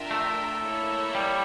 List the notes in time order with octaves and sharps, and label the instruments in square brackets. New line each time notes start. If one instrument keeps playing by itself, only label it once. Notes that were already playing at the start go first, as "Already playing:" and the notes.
Already playing: [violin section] D4 F4 A#4 E5 G5
[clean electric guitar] A3
[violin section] A#3 E4 A4 C#5 E5
[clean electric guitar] G3